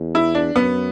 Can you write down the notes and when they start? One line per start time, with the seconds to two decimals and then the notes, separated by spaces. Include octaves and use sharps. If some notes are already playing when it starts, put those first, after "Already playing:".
Already playing: E2
0.15 E4
0.35 D4
0.55 F#2 B3